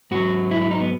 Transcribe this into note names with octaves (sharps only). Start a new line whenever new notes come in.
G#2 F#3 F#4
E4
E4
D#4
B3